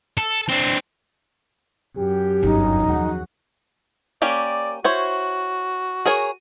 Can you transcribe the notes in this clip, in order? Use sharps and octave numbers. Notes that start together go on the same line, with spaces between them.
A4
C4 D4
F#2 G4
G1 E2 D#4
D#2 F3 F#4 G#4 F#5
A#3 C#4 G4 D5
E4 F#4 C5 C#5
G#4 A#4 C#5